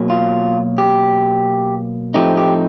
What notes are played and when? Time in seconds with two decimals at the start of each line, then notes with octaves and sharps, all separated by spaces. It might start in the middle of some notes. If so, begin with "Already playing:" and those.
Already playing: B2 F#3 A#3
0.10 F4
0.78 G4
2.14 A2 F3 A3 C4 D#4 G4
2.37 G4